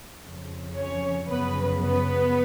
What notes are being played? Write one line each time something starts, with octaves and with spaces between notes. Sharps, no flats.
F2 C#3 F3
C#4 C#5
F#2 C#3 F3 B3 B4
B3 B4